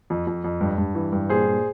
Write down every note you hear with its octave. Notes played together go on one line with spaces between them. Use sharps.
F2
F2
F2
G2
G2
E3
G2
A#2 G#4 C5
A#2